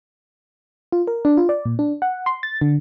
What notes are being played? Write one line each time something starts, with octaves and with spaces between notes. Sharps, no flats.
F4
A#4
D4
F4
D5
A#2
D4
F#5
C6
A6
D3